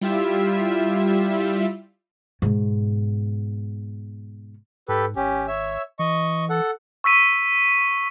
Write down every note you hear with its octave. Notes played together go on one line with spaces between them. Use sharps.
G3 E4 F4 G4 E5
G#2 B2
G#2 G4 A4 B4
G#1 C#4 G4
C#5 E5 E6
E3 D#5 C#6
A4 F#5
C#6 E6 B6 D#7